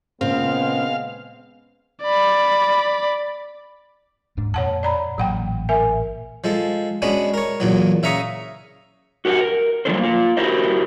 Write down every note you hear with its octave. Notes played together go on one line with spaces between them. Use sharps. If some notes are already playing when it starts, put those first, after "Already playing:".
A#2 C#3 G#3 B3 C4 F5
D5 B5
D#1 G#2 D4
F2 A#2 C#5 F#5 A5
D5 A#5 B5
A1 A#2 F#3 F#5 G5
A#4 E5 G#5
F3 G#3 A4
G#3 B3 C#4 D4 F#4
A#4 C#5
E2 A#2 F#3
C#3 E5 F5 A#5 C#6 D#6
F#4 G4 A#4 D#5 F#5
A#4
F3 G3 A#3 D4 A4 C5
A#3 F4
E4 F#4 G4 A#4 C5 D#5